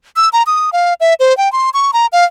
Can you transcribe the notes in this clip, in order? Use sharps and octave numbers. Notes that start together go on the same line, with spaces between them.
E6
A#5
D#6
F5
E5
C5
G5
C6
C#6
A#5
F5